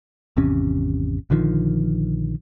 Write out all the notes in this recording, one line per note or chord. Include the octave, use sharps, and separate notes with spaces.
G#1 E2 C3 C#4
A#1 D3 D#3 F3